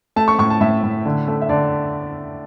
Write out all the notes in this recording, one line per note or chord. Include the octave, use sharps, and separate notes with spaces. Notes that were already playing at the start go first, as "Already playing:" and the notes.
A3 A5
C#6
A2 C#6
A5
A2 E5
A2
D3
A3
E5
D3 D5